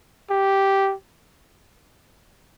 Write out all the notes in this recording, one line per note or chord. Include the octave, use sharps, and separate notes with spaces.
G4